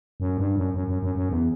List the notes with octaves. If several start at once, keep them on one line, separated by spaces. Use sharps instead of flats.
F#2
G2
F#2
F#2
F#2
F#2
F#2
E2